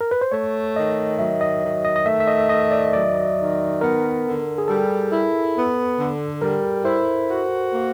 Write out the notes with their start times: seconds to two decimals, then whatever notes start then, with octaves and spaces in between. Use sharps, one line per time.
0.01 A#4
0.11 B4
0.21 C5
0.32 A3 C#5
0.76 D#3 D#5
1.19 F#3 E5
1.41 D#5
1.63 D#3
1.85 D#5
1.96 D#5
2.06 A3 E5
2.20 E5
2.28 D#5
2.49 D#3 D#5
2.71 D5
2.93 F#3 D5
3.37 D#3
3.81 B3 A#4
4.24 D3
4.58 G#4
4.68 G3 A4
5.12 E4
5.54 B3
5.98 D3
6.42 G3 A#4
6.85 E4 C5
7.29 F#4
7.72 A#3